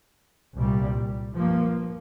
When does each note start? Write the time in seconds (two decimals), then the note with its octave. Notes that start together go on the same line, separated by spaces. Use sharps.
0.57 C2 A#2 G3
1.33 G2 F3 A#3